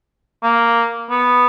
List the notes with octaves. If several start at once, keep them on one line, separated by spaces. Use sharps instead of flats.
A#3
B3